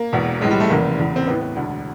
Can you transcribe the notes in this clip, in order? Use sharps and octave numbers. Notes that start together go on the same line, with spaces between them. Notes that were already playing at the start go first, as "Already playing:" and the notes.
Already playing: A#3
E1 E2 B2
B1 A2 E3 G#3
G3
A3
F1 E2 C#3 E3 A#3
F1 E2 C#3
C4
A1 A2 E3 B3
B3
E1 D2 D3